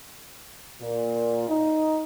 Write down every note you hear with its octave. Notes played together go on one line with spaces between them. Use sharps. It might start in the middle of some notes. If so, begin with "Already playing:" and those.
A#2
D#4